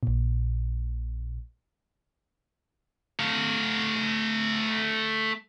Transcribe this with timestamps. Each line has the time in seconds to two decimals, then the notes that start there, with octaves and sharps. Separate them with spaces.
0.03 A#1 A#2
3.19 A3 F5